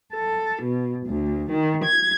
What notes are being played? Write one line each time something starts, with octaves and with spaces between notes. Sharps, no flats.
A4
B2
D2
D#3
G#6